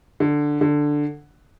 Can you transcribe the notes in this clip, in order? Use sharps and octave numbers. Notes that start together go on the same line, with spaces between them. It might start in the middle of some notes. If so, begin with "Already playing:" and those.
D3
D3